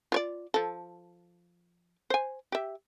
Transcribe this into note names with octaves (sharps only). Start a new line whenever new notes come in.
F4 C#5 D5
F3 A4
C5 G#5
G4 E5